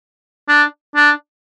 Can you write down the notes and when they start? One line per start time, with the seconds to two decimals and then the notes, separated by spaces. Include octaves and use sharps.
0.48 D4
0.96 D4